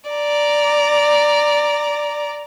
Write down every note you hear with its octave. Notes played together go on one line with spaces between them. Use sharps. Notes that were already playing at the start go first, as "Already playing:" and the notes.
D5 A#5